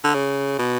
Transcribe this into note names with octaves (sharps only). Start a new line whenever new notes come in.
D3
C#3
B2